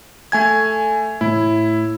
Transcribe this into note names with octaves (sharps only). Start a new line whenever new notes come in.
A3 G#5 G#6
A2 E4